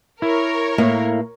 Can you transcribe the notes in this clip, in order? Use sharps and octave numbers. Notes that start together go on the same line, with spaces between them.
E4 A#4 C#5
A2 A#3